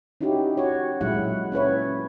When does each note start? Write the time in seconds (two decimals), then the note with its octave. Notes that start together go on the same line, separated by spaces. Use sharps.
0.21 C#4 D#4 E4 F#4 G4
0.57 F#4 C#5
1.01 A#2 F#3 G#3 E4 F#5
1.52 C#4 E4 B4 C#5